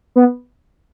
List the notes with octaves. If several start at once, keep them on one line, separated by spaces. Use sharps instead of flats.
B3